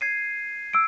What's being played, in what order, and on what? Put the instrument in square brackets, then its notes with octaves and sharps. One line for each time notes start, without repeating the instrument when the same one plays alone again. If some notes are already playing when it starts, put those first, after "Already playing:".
[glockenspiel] G#6 C7 D#7
[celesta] E6 D7